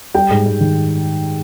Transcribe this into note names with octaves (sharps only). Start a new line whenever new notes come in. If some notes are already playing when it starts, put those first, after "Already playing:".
G3 G5
G#2
G#2
D#3